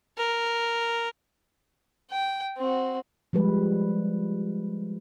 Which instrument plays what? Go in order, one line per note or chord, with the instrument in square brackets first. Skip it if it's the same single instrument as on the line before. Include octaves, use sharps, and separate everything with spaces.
[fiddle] A#4
G5
C4 F#4
[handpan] F3 G3 G#3 B4